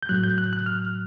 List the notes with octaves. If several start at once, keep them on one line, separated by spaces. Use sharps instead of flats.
G6
A2 F#3 F#6
G6
F#6
F#6
F6